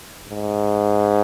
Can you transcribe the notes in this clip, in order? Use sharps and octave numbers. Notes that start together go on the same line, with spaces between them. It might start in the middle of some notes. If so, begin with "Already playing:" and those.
G#2